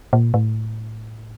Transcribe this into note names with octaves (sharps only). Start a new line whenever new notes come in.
A#2
A2